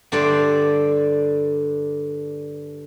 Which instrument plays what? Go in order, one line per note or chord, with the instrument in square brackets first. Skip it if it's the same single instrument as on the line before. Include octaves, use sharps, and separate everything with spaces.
[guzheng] G2 D3 G4 C5 D5